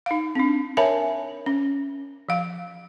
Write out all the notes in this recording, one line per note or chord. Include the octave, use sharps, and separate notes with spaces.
D#4 F5
C4 D4
A#4 C#5 E5 G#5 A5 B5
C#4
F3 F5